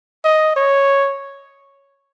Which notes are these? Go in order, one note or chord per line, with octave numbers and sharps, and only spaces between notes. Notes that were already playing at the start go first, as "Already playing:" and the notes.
D#5
C#5